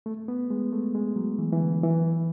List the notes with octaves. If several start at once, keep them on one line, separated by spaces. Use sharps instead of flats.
A3
B3
G#3
A3
G#3
F#3
E3
E3
D3
E3